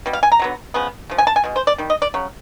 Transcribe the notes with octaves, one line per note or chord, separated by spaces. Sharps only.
B2 G3
F5
G#5
A#5
D3 F#3 B3
C#3 F3 G#3 B3
C#3 F3
G#5
A5
G#5
B2 G#3
C5
D5
D#3 G3
D#5
D5
C#3 F#3